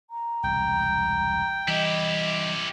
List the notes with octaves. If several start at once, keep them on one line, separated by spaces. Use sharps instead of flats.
A#5
E1 C2 G5
E3 G3 E4 G4 D#5